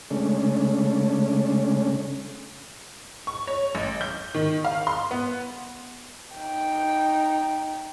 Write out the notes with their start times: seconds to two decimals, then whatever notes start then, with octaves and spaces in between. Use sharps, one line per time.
0.11 C#3 G#3 A3 C#4 D4
3.27 C#6
3.47 C#5
3.75 A1
4.01 G6
4.35 D#3
4.65 F5
4.87 C6
5.11 B3
6.36 D#4 G5